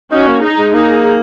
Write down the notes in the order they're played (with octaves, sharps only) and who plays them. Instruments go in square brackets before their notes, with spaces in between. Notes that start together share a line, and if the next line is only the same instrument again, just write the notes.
[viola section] C#4 F#4 [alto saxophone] D#4
[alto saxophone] A#3
[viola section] D#4 G#4
[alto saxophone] G#3
[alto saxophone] A#3 [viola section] D#4 G#4